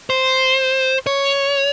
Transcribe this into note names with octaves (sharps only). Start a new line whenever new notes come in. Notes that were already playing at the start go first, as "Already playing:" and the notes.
C5
C#5